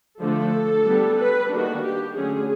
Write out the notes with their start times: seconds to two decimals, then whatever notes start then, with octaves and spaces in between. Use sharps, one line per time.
0.21 D3 F3 A3 D4 A4
0.86 G3 B3 D4
1.18 B4
1.51 D#3 G3 A#3 D4 F#4
1.83 G4
2.16 D3 F#3 A3 C#4 G#4